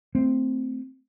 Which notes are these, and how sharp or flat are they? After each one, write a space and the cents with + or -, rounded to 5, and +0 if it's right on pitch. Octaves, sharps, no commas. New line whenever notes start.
A3 +25 C4 -5